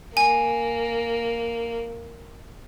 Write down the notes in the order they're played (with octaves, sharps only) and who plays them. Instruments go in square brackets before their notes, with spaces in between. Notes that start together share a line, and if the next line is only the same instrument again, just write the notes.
[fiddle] A#3 [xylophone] G#5